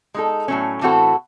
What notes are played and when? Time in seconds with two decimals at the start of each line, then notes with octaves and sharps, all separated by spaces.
0.14 G#3 D#4 A4
0.48 A2 F#3 A3 C#4
0.81 A2 E3 C4 F#4 A4